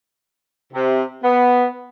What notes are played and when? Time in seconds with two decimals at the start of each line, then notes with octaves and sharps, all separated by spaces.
0.73 C3
1.23 B3